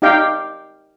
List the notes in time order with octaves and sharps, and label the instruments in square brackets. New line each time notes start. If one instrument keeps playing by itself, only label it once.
[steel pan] D#4 G4 D5 F5 G5